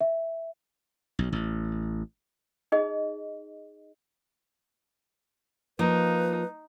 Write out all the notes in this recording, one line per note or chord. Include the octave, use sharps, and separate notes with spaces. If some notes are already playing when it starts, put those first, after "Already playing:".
E5
B1
A1
D#4 G#4 D#5
F3 A#3 D#4 B4